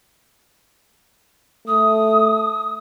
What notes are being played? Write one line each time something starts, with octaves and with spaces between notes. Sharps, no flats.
A3 D#6